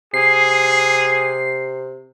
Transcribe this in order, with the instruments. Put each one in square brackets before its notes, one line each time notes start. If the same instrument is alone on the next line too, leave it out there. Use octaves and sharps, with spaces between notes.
[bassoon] C3 [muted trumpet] G#4 [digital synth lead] C7